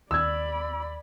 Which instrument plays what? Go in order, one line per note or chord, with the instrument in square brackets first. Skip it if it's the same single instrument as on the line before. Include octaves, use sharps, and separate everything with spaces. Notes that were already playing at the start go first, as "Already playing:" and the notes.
[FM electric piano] D#2 [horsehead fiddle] D5 B5 [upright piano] E6 G#6